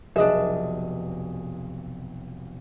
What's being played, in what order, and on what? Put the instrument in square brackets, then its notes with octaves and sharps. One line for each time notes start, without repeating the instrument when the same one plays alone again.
[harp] F1 B1 [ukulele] D4 D#5 E5 [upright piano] G#4